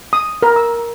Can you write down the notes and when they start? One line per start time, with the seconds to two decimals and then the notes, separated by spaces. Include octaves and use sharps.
0.13 D#6
0.42 A#4
0.56 E6